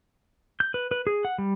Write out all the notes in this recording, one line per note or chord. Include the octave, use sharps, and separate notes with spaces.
G6
B4
B4
G#4
F#5
G3